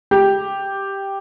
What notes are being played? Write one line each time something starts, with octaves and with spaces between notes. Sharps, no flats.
G4